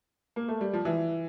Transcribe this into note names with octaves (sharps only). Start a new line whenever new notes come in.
A#3
A3
G3
F3
E3